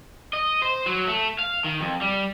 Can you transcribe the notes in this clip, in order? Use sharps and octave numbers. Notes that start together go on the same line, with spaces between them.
D#5
C5
F#3
A3
F5
D#3
F2
G3